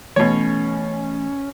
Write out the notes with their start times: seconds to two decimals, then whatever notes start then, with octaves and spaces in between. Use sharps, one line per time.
0.16 B2 E3 A3 C#4 C#5